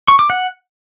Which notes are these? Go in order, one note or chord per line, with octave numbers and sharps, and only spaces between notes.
C#6
D6
F#5